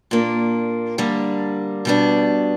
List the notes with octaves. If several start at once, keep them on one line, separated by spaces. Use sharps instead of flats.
A#2 A#3 D4
D3 G3 A#3 D4
B2 G3 B3 D4